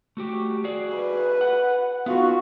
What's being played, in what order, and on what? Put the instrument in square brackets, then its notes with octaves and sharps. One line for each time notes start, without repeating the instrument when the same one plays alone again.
[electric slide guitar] A3 F#4 G4
F#4 G#4 D5
[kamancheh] B4
[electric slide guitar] F#5
[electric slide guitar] B3 D#4 [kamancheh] F4 F#4